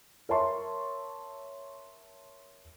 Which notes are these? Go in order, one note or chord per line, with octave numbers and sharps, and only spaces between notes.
A#4 C#5 E5 A5 C6 C#6